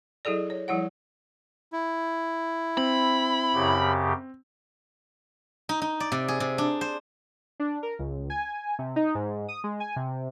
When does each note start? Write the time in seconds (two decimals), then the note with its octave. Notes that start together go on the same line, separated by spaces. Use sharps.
0.25 F#3 E4 G#4 A4 D5
0.50 C#5
0.68 F3 G3 E4 C#5 F#5
1.73 E4
2.77 C4 B5
3.54 F#2 C#3 G4
5.69 D#4
5.82 D#4
6.00 D5
6.12 C3
6.28 G#4
6.40 C3
6.58 D4
6.81 C5
7.60 D4
7.83 A#4
7.99 C#2
8.30 G#5
8.79 C3
8.96 D#4
9.15 G#2
9.48 D#6
9.64 G#3
9.80 G#5
9.96 C3